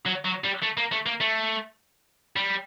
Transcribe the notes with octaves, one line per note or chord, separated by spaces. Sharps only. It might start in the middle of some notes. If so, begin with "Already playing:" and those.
F#3
F#3
G3
A3
A#3
A3
A#3
A3
G3